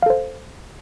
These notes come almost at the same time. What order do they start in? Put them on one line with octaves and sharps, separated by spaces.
F5 A4 C5